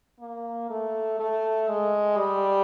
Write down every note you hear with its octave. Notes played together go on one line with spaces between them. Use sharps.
A#3
A3
A3
G#3
G3